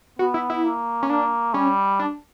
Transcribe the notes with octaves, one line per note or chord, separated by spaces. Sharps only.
B3 F#4
E4
E4
A#3
C#4
A#3 D4
G3 C#4
D4